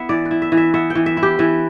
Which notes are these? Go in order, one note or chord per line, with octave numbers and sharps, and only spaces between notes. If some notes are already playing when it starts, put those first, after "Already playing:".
Already playing: B3 E4 E5
E3 D5
B4
E4
E5
E3
E5
B3 E5
G5
E3
E5
E4
G4
E3 E4